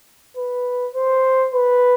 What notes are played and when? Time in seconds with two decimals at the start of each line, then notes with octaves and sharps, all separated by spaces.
0.37 B4
0.95 C5
1.54 B4